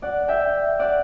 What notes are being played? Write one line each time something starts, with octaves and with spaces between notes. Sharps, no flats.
D5 F#5
E5 G5
D5 F#5